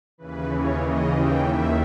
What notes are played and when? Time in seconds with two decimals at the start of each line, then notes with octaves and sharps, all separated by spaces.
0.18 D#2 C#3 E3 B4
0.49 C#5
0.79 D#2 C#3 E3 D#5
1.11 G5
1.41 D#2 D#3 E5